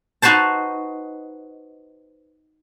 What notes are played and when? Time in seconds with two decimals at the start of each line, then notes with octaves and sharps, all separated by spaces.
0.22 D#4 F#4 B4 C5 A5